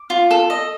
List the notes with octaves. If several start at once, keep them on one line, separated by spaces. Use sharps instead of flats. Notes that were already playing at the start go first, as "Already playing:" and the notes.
Already playing: D6
F4
A4
D#5